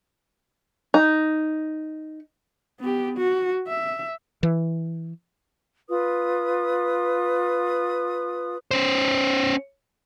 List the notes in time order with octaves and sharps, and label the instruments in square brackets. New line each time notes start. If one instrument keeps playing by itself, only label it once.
[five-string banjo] D#4
[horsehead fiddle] B3 G4
F#4
E5
[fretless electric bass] E3
[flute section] F4 B4 D#6
[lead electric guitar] C#4 C5